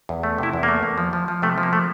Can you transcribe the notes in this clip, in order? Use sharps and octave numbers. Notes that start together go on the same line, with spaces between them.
E2
A3
C3 E4
E2
A#3
A3
E2
F3
F3
F3
C3 A3
F3
A#3
A3